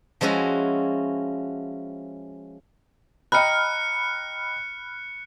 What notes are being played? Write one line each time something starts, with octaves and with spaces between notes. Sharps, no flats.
F3 G#3 C#4 E4 F#4
D#5 G5 A#5 B5 F6 F#6 C#7